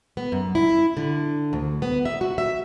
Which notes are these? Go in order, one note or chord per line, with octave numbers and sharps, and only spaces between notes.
B3
F#2
E4
D3
D2
B3
E5
F#4
E5